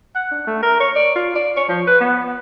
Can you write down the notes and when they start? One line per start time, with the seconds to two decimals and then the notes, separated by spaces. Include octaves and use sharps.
0.15 F#5
0.31 D4
0.47 A3
0.63 A#4
0.80 C#5
0.96 D5
1.16 F4
1.35 D5
1.57 C#5
1.69 F3
1.87 B4
2.01 B3